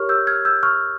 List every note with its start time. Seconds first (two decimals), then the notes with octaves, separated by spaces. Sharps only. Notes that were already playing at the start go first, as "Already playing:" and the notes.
Already playing: G4 A#4 C#5 C#6 F6
0.09 E6 G6
0.27 F6 G#6
0.45 E6 G6
0.63 C#6 F6